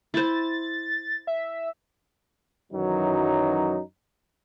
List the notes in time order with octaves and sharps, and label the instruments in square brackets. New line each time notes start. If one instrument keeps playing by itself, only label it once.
[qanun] E4 C5 [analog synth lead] A6
[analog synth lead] E5
[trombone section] F#2 D#3 E3 F#3 D#4